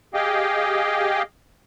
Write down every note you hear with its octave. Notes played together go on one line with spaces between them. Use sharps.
G4 G#4 D#5 F5 G5